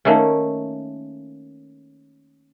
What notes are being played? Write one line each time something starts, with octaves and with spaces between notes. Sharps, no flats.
D#3 A3 A#3 C#4